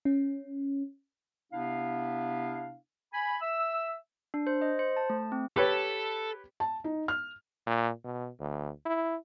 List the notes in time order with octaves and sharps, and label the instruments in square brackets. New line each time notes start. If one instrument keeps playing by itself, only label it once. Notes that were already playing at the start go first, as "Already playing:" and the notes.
[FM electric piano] C#4
[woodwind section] C3 B3 D4 E4 F5
G#5 B5
E5 E6
[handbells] D4
C5
D#5
C5
A5
A3
C4
[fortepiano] G4 B4 C#5 [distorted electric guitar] A4
[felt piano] A5
D#4
F6
[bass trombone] A#2
B2
D2
E4